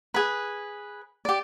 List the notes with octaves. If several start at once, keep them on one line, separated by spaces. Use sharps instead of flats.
G#4 B4
G4 D5